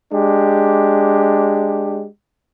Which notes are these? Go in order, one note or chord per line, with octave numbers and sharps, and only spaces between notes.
G#3 D4 G4